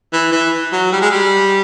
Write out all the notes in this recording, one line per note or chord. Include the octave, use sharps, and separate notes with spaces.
E3
E3
F#3
G3
G#3
G3